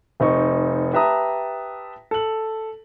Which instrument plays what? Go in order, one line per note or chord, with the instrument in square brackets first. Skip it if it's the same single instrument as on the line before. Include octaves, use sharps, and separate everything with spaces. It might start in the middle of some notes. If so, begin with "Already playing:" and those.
[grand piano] F1 C4 D#4 C#6
G4 B4 E5 A5 A#5 D#6
A4 F#7